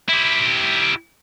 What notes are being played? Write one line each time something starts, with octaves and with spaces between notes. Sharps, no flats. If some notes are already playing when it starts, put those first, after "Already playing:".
E4 G4